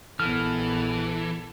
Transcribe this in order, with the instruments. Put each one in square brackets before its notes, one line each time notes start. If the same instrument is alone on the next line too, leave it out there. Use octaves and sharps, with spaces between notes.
[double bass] A#1 B3 [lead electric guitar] E3 [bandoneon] A4 [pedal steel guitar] F6